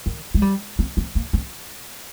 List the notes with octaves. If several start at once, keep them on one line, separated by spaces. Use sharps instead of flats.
D#3
G#3
G3
C4
C4
A#3
C4